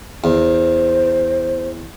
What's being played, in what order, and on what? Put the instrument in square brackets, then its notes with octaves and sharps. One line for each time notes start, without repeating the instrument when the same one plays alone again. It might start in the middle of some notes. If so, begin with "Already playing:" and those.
[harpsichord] E2 [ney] C5